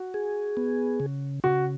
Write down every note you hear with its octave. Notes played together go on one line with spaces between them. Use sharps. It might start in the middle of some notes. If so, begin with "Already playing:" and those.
Already playing: F#4
G#4
B3
C#3
C#3 F#4